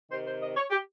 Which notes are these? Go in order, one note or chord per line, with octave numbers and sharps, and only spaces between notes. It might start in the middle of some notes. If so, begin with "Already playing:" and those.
C3 D#3 C5
C5
D#5
C#5
G4